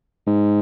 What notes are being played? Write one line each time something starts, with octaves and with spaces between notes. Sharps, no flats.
G#2